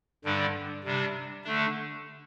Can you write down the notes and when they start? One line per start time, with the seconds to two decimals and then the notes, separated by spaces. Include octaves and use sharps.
0.24 G2 D3 G3 D4
0.84 C3 G3 D4
1.44 D3 A3 D4